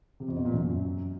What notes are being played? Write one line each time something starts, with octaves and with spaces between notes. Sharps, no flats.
C3
F2
B2
A#2
F#2